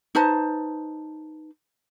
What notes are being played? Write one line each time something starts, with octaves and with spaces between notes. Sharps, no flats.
D#4 B4 C5 A5